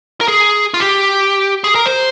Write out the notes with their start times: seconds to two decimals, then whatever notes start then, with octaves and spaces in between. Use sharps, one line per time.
0.21 A#4
0.28 G#4
0.74 F4
0.80 G4
1.64 G#4
1.75 A#4
1.86 C5